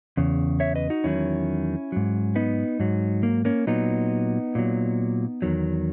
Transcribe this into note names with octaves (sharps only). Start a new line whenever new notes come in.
E2 C#3
C#5 E5
B4 D#5
D#4 F#4
E2 D#3 F#3 C#4 E4
G#2 F#3
B3 D#4
G#2 F#3
A#3
A#3 C#4
A#2 F#3 B3 D#4
A#2 F#3
E2 D#3 F#3